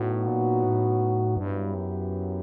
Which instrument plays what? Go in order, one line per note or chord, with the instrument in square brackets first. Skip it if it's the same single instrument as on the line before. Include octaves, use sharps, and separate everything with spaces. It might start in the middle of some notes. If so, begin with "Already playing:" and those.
Already playing: [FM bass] A2 [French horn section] F#3 B3 D#4 F#4
[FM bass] A#2
A2
[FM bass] G2 [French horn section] F#3 B3 E4 G4 B4
[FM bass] F#2